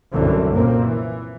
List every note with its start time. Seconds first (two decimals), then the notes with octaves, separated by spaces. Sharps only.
0.13 C2 F#2 A2 D3 E3 C4
0.54 F#2 A#2 A#3 C4
0.83 E3